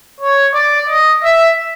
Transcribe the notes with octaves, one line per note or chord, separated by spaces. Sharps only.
C#5
D5
D#5
E5